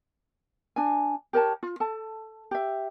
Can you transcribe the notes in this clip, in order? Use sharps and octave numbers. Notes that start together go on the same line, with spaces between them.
D4 G#5
G4 A#4 C#5 A5
F4
A4 A5
G4 E5